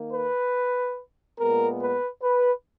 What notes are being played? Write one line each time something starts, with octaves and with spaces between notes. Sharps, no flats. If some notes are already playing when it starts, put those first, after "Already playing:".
Already playing: D#3 A#3
B4
A#2 G#3 B3 A#4
B4
B4